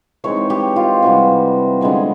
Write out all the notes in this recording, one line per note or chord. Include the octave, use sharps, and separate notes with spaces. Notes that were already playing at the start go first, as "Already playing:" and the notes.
E3 G#3 C4 D#4 C#5
G4
F4
C3 E3 G3 F#4
D3 F3 G#3 B3